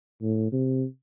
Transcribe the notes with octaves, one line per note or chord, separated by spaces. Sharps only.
A2
C3